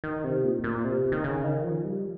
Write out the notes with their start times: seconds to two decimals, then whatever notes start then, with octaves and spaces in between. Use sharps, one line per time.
0.04 D#3
0.24 C3
0.44 A#2
0.64 A#2
0.84 C3
1.12 D#3
1.24 C#3
1.44 D#3
1.64 F3
1.85 G3